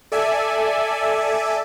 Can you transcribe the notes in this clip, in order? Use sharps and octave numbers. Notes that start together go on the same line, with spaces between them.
A4 D5 E5 G#5